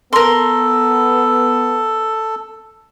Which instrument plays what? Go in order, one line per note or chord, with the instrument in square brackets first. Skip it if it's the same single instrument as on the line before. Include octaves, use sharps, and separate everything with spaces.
[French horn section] B3 [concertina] A4 [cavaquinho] A#4 C6